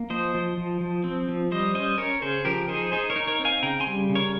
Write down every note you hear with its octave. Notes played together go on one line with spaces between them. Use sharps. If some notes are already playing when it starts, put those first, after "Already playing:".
Already playing: A#3
F3 C5 D#5
F3
F3
F3
C4
F3
G3 C5 D#5
C#4 C5 D#5
C#4 A#4 C#5
C#3 G#4 C5
F3 G4 A#4
D#4 G#4 C5
D#4 G#4 C5
A#4 C#5
D#4
A#4 C#5
C4
F5 G#5
C#3 G5 A#5
G#5 C6
G3
C#3
A#4 C#5